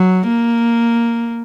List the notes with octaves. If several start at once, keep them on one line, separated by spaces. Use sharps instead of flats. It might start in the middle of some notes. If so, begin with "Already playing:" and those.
Already playing: F#3
A#3